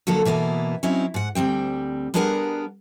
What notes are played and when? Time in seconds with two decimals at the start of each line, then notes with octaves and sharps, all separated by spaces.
0.07 D3 F#3 A#3 A4
0.25 B2 E3 A#3 B3 E4
0.83 F#3 C4 C#4 D#4 E4
1.14 G#2 F#5
1.35 D2 G3 C4 G5
2.14 G3 B3 D4 G#4 A#4 F#5